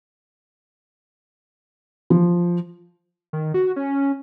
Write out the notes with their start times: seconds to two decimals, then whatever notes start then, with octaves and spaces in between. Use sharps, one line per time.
2.10 F3
3.33 D#3
3.54 F#4
3.76 C#4